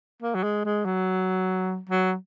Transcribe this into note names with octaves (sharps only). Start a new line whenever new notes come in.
A#3
F#3
G#3
G#3
F#3
F#3